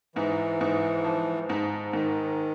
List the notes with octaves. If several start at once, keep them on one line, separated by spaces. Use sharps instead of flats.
G#2 E3
G#2
F3
G#2
G#2 D#3